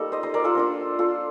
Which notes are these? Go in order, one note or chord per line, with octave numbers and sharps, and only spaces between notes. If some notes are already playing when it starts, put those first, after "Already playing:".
Already playing: G3 A#3 D#4 F4 A4
C5 D#5
C5 D#5
A#4 D5
F4 A4
A#3 D4 F4
F4 A4